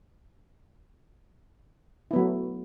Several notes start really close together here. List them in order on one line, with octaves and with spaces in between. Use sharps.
E4 B3 F#3 A3